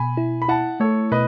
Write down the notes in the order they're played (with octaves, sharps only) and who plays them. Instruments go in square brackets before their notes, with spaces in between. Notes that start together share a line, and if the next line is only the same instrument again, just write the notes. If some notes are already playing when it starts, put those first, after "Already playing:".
Already playing: [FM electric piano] B2 [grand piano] G#5 B5
[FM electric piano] E4
[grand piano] B5
[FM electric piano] E4 [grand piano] F#5 A5
[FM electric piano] A3 [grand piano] A4 C#5
[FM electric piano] B2 [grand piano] B4 D#5